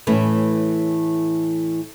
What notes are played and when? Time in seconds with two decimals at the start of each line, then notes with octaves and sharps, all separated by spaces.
0.07 A2 E3 A3 C#4 E4 B4